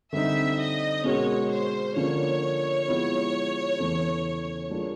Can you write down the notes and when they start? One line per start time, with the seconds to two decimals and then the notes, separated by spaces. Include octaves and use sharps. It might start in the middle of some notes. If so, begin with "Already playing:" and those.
0.13 D3 G3 C4 D#4 E5
0.58 D#5
1.04 B2 G#3 C#4 F#4 A#4 C#5
1.51 C5
1.95 D3 F3 A#3 C#4 F4 C#5
2.87 F3 G#3 B3 E4 G4
3.79 E2 C#3 E3 A3 C#4
4.70 G3 A#3 D4 F4 G#4